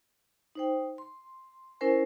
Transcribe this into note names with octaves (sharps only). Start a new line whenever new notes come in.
D#4 C5 G5
C6
C#4 E4 A#4 C5 G#5